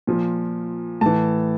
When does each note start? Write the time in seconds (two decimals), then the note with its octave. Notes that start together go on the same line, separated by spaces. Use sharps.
0.07 A#2 F3
1.01 A2 E3 A5